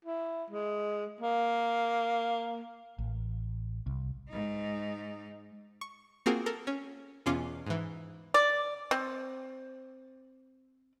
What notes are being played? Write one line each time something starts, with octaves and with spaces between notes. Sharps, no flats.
E4
G#3
A#3
A1
C2
G#2 D#4
C#6
A#3 C4 F4 F#4 G#4 A#4
A4 A#4
C#4
E2 B2 C#4 F4 C6 D6
G#2 E3
D5
C4